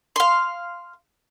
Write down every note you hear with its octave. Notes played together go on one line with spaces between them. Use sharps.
F5 C6